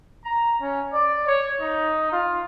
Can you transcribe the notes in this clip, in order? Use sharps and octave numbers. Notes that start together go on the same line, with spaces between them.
A#5
C#4
D5
C#5
D#4
F4